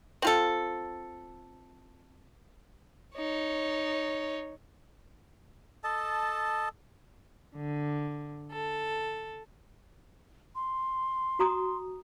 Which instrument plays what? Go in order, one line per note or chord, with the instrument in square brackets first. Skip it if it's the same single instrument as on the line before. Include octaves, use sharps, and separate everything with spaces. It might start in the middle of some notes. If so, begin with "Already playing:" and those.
[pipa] C4 F4 A4
[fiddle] D#4 C#5
[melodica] A4 D#5 A5
[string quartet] D3
A4
[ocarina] C6
[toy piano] F#4 A#5 D#6